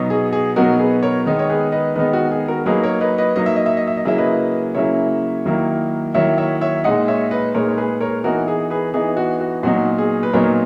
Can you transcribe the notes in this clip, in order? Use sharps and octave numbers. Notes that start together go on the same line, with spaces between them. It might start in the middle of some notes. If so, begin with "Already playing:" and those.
Already playing: B2 F#3 B3 D#4
G#4
G#4
B2 F#3 B3 D#4 F#4 A#4
G#4 B4
A#4 C#5
D#3 G#3 B3 D#4
C#5
G#4 B4
B4 D#5
D#3 G#3 B3 D#4 B4 D#5
F#4
G#4
F#4 A#4
F#3 A#3 D#4 G#4 B4
A#4 C#5
B4 D#5
B4 D#5
F#3 A#3 D#4 D#5
E5
D#5
E5
D#5
E5
D#5
C#3 F#3 A#3 C#4 E4 E5
B4 D#5
C#3 F#3 A#3 C#4 E4 C#5 E5
D#3 F#3 A#3 E4
D#3 F#3 A#3 E4 C#5 E5
C#5 E5
C#5 E5
A#2 G#3 D#4 D#5 F#5
C#5 E5
B4 D#5
A#2 G#3 D#4 A#4 C#5
C#5
G#4 B4
A#4 C#5
E3 B3 D#4 F#4 A#4
G#4
G#4 B4
E3 B3 D#4 G#4
F#4
F#4
A#2 F#3 B3 D#4 F#4
G#4
B4
A#2 F#3 B3 D#4 A#4 C#5